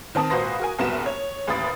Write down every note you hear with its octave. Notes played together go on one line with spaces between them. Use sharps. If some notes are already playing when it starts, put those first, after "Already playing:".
D#3 C4 A5 D#6
G#1 A#2 F#4 B4 C5 A#6
F#4 A#4 G#5
F#1 C2 B3 F#4 E7
C#5
A1 D#2 B5 D#6 A6